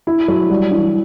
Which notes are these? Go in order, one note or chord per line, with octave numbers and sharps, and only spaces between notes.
E4
F#3
G3
E3